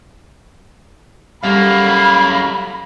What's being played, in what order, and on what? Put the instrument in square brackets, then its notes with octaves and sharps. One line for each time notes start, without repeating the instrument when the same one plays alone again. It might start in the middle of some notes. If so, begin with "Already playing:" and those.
[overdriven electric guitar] F#2 A#3 [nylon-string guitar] G3 A4 [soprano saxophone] F5 [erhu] B5